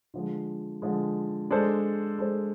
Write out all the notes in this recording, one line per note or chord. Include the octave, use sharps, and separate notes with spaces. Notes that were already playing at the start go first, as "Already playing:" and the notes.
D3 F3 G#3
D3 F3 G#3
G#3 D4 A4 C5
G#3 D4 A4 C5